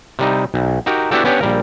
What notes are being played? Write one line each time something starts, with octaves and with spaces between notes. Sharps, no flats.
C3 G3 D#4
B1
D#4 F#4 G4 A#4
B3 D4 E4 F#4 G4 A4
B3 C#4 D4 G4 B4 C#5
A#1 G3 A#4